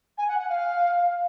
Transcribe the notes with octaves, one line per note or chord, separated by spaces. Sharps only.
G#5
F#5
F#5
F5